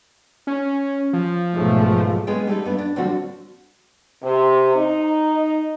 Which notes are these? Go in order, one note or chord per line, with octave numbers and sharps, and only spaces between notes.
C#4
F3
B1 G#2 A3
G#3 B3 C#4 G#4 G5
G3 A3 D#4
G2 B3
D4
A2 D3 F3 G3 C4 F#4
C3
D#4